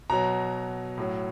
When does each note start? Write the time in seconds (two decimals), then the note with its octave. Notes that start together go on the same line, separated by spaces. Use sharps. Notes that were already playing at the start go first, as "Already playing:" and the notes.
0.10 B2 F#3 A#5
0.98 A2 F#3